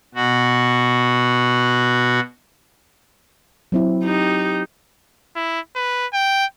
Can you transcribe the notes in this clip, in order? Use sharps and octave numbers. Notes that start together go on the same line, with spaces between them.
B2 F#4
F#3 C4 E4
D#4 G4
E4
B4
G5